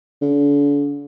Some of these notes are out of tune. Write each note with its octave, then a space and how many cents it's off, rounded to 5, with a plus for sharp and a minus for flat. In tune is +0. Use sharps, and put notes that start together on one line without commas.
D3 -40